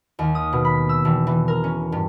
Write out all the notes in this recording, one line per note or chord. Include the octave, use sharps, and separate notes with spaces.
D#2
D#6
B2
B5
E6
E1
E3
A#4
C#4
G2